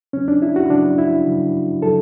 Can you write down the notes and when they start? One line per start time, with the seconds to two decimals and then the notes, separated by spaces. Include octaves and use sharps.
0.13 C#3 F#3 C#4
0.28 D4
0.42 E4
0.56 F#4
0.70 C#3 F#3 D4
0.98 E4
1.27 C#3 F#3
1.82 C#3 F#3 A4